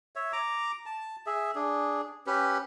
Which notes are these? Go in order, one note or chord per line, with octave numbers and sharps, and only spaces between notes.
C#5 E5
A#5 D6
A5
G#4 E5
D4 G#4
C#4 G4 B4